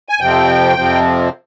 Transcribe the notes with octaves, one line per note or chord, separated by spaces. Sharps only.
G#5
F2 C3 F3 C4 G5
F2 C3 F3 C4